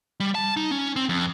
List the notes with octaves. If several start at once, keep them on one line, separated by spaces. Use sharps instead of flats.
G3
A5
D#4
C#4
C4
F2